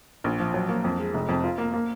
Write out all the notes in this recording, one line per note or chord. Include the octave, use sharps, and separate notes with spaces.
A#1
F3
F#3
A#3
F2
G#3
F1
F2
F4
A#3
A#3